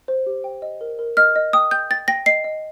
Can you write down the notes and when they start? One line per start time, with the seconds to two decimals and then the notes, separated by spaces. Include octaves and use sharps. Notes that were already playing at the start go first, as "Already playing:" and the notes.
0.08 C5
0.26 G4
0.44 G5
0.62 D#5
0.81 A#4
0.99 A#4
1.17 D#5 F6
1.36 D#5
1.53 G5 D#6
1.71 G5 G6
1.90 G5 A6
2.08 G5 A#6
2.26 D#5 C7
2.44 D#5